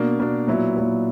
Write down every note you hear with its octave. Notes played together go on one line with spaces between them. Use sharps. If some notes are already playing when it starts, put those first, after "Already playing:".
Already playing: B2 A#3 D4
B2 A#3 D4
A#2 F#3 B3 E4
A#2 F#3 B3 E4